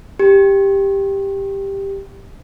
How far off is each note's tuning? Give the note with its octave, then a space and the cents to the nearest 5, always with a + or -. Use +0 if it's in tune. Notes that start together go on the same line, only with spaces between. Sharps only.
G4 +5